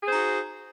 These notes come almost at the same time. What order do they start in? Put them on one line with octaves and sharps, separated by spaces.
G#4 C5 D#4 F#4